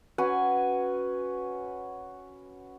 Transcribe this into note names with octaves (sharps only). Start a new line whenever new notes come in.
C#4 F#4 B4 G#5